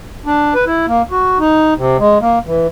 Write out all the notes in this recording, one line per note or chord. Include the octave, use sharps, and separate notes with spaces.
D4
B4
E4
A#3
F#4
D#4
C3
G#3
A#3
E3